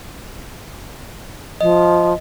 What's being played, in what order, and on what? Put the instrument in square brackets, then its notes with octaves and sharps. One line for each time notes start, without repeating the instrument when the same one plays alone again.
[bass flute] F3 [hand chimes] D#5